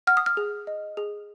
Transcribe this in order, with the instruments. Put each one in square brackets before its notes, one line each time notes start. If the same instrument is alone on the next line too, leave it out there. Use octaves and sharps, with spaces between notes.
[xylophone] F#5 F6
D#6
F6
G#4
D#5
G#4